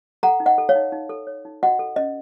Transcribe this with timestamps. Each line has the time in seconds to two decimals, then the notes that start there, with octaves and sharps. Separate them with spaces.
0.23 A4 F#5 A#5
0.40 D#4
0.46 D#5 F#5
0.58 A4
0.69 C#5 F5
0.75 D#4
0.92 D#4
1.09 A4
1.27 C#5
1.45 D#4
1.63 F#4 D#5 F#5
1.79 A4
1.96 C#4 D#5